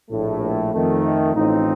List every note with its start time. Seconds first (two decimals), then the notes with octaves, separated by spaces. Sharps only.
0.10 A#1 A2 A3
0.72 F2 D#3 A3
1.34 A1 A2 F3 C4 D#4